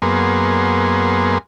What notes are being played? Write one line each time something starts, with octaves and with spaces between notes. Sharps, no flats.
F#2 A#3 B3 G#4 C6